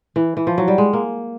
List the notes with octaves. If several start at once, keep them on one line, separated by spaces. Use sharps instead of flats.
E3
E3
F3
F#3
G3
G#3
A#3